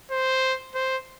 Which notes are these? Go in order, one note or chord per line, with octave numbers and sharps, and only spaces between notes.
C5
C5